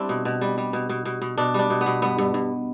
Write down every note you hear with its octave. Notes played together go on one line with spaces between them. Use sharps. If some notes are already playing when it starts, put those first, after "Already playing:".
Already playing: G3 C4 D4 E4
B2
B2
G3
G3
B2
B2
B2
B2
B2 D4
G3 D4
B2
B3
B2
G2 B3
G2
G2